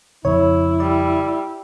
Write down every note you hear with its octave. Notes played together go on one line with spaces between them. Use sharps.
F2 C#3 E4 C#5
G3 D5